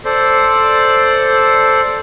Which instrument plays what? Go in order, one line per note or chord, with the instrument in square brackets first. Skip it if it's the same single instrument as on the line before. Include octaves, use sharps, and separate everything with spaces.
[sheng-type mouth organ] A4 C5 D5